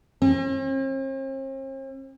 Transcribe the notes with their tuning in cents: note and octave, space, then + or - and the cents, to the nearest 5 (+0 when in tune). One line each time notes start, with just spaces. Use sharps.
C4 +45